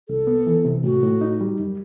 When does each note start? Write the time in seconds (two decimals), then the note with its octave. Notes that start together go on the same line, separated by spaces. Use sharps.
0.09 C2 A4
0.27 B3
0.47 E3
0.65 C3
0.84 A2 F#4
1.03 A2
1.21 D#4
1.41 G3
1.59 F#2